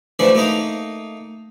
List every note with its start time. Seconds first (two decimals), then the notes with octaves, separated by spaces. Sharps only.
0.19 E3 F3 A3 D4 F#4
0.35 A3 A#3 D#4 A#5